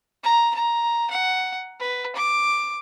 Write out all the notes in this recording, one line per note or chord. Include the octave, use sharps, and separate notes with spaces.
A#5
A#5
F#5
B4
D6